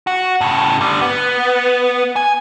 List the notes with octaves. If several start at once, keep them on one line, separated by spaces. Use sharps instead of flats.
F#4
A2 C#3
D3 G3
B3
G#5